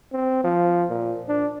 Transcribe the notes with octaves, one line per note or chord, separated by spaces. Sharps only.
C4
F3
A#2
D4